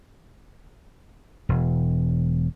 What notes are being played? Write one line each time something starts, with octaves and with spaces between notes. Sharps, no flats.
E1